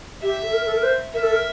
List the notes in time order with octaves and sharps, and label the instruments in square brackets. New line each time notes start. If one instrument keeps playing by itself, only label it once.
[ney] G4 [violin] E5
[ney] A4
A#4
A4
A#4
C5
[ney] A#4 [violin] E5
[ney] A4
A#4